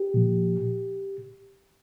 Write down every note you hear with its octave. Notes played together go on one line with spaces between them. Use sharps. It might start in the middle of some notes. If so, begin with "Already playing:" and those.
Already playing: G4
A#2 F3